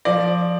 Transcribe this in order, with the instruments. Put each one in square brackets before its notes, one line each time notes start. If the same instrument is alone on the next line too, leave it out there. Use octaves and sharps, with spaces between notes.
[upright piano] F3 D5